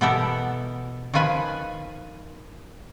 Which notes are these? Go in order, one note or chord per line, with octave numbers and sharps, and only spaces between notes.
B2 E3 B3 G4 A4 A#4
D#3 F3 F4 B4 G#5